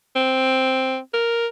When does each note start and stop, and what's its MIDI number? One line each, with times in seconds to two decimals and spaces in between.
0.16 0.98 60
1.14 1.47 70